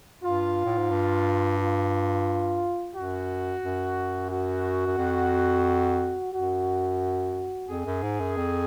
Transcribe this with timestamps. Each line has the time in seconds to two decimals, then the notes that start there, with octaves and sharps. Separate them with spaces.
0.22 G2 F4
0.65 A2
0.78 G#2
0.90 G2
1.59 F4
2.94 F#2 F#4
3.62 F#2
4.30 F#4
4.86 F#2
4.98 F2
6.33 F#2 F#4
7.69 F2 G#4
7.86 F#2
8.03 G#2
8.20 F#2
8.37 F2